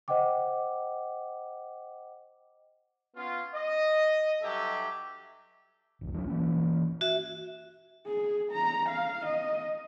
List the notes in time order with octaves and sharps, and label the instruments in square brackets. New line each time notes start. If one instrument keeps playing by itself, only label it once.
[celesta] C5 D#5 F#5 G5 D6
[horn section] B3 C#4 F4
D#5
G2 F#3 G4 A4 E5
[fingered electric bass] F1 C2
D#2 F3 F#3
E3 A#3 C#4
[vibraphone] F#4 E5
[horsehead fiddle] G#4
A#5
F5
D#5